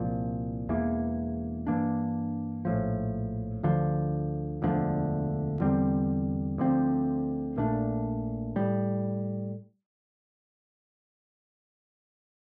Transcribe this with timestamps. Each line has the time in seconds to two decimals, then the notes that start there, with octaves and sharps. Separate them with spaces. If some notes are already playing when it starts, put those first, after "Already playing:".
Already playing: C2 A#2 F3
0.69 E1 E2 E3 A#3
1.67 G2 E3 A#3 D4
2.65 A#1 A2 F3
3.63 D2 D3 F3
4.62 E1 D2 D3 F3
5.60 E2 D3 G3 C4
6.58 D2 D3 F3 C4
7.57 A#1 A#2 A3 D4
8.56 A2 G3